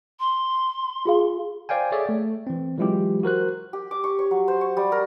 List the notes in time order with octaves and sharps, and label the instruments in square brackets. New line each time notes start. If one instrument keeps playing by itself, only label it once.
[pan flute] C6
[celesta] F4 G#4 F5
[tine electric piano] C5 D5 F5 G5 G#5
G#4 A4 C#5 D5 E5
A3
E3 C4
E3 F#3 G#3 E4 F4 G4
F#4 A#4 C5 F#6
[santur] G4
D6
C#6
C#5
F#3
C5
C#6
G3
A#4